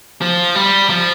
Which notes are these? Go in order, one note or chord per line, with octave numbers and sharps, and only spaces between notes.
F3
G3
F3